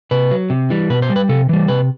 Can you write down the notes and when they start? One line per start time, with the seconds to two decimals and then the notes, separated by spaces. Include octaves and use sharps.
0.11 C3 B4
0.31 F#3
0.50 C3
0.70 E3 G3
0.90 B2 B4
1.02 C5
1.10 G3
1.16 B4
1.29 C3 A4
1.49 E3 G3
1.68 C3 B4